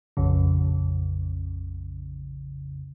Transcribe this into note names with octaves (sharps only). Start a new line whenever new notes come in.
A#1 F2 C#3